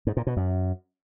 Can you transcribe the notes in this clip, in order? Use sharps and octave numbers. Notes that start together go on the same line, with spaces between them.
G#2
A#2
B2
F#2